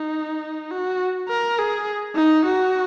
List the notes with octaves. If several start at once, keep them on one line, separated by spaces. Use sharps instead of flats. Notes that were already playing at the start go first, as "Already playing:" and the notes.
Already playing: D#4
F#4
A#4
G#4
D#4
F#4